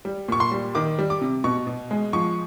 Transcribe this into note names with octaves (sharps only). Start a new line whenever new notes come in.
G3
A#2 C#6
C6
G3
D#3 D6
G3
D6
C3
B2 C#6
B2
G#3
F3 C#6